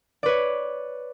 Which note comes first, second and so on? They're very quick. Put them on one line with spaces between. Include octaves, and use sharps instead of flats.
D5 B4 C#5